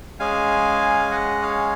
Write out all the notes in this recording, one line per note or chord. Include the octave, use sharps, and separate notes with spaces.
G#3 C#4 G#4 F5 G#5
D#5 F#5
C#5 F5